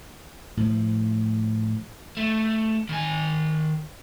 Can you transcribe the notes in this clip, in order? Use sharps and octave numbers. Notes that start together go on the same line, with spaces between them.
A2 F3
A3
D#3 G#5